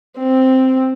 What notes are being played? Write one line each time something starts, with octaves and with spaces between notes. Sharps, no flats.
C4